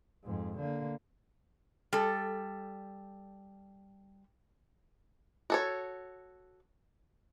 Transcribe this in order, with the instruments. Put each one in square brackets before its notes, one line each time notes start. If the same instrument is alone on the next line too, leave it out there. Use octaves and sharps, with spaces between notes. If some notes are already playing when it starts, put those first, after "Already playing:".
[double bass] F2 G#2
D3 A#3
[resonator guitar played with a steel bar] G3 A4
[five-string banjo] F#4 A4 C#5